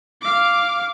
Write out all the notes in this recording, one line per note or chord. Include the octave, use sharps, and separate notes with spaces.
F5 D6